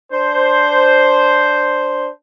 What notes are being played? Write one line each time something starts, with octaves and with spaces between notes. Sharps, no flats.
D4 C5